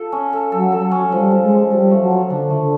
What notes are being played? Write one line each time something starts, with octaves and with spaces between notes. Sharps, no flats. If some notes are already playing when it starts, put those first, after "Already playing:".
Already playing: F4 A4
C#4
A4
F#3 A4
A4
F#3
C#4
F3 G3
F3
G#3
F3
F3 G3
A3
F#3
F3
D3 D4
A3
D3